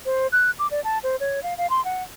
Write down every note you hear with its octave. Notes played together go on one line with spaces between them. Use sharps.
C5
F#6
D6
D5
A5
C5
C#5
F5
F5
C6
F#5